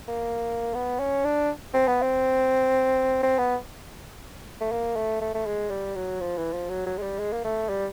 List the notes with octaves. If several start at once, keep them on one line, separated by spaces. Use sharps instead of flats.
A#3
B3
C#4
D4
C4
B3
C4
C4
B3
A3
A#3
A3
A3
A3
G#3
G3
F#3
F3
E3
F3
F#3
F#3
G#3
G3
G#3
A#3
A3
G3